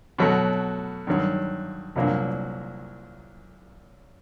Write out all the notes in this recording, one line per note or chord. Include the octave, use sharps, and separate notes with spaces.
B2 F#3 A3
G2 D#3 F#3
C2 A#2 F#3 A#3 D4